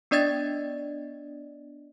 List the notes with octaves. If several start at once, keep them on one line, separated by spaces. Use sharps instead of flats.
B3 D4 D5 D#5 G#6 A6